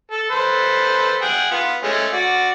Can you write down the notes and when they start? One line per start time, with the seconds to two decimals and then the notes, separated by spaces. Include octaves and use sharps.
0.11 A4
0.31 A4 B4 C5
1.22 G#4 F#5 G5
1.51 B3 F4
1.83 G#3 A3 C#4
2.13 F#4 D5